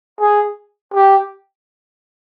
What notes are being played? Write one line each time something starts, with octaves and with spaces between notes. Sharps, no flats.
G#4
G4